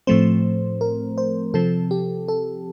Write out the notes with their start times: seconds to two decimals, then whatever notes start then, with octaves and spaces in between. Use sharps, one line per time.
0.07 A2 F3 A3 C4 C5
0.81 A#4
1.18 C5
1.54 C3 F3 C4 A4
1.91 G4
2.28 A4